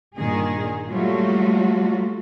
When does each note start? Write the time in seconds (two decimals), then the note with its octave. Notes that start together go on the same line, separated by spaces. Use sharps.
0.14 G2 A#2 D#3 G#4
0.88 F#3 G3 A3 A#3 F4 F#4